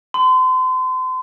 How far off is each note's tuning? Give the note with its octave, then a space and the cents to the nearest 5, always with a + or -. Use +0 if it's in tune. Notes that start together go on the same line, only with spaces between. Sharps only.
C6 -35